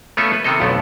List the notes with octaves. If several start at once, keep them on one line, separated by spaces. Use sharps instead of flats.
A3 B3 C#4 F4 A4 E5
B4
C3 D#3 B3 C4 A4 D#5
B1 F2 D3 A3 B3